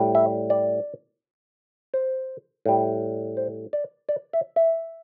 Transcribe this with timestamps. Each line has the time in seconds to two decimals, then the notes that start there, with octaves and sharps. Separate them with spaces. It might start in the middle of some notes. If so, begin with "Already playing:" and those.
Already playing: A2 G3
0.15 E5
0.50 D5
1.94 C5
2.66 A2 G3
3.37 C5
3.73 D5
4.09 D5
4.33 E5
4.56 E5